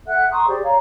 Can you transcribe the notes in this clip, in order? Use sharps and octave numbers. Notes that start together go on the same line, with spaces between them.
A4 E5 F#5 F#6
A#5 C6 C#6 D#6
G4 G#4 C5 D5
C#5 D5 F5 A#5